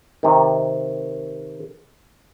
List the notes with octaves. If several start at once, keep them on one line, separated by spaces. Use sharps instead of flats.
C3 D#3